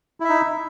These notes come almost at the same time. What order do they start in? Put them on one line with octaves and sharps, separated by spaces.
E4 E5 D#4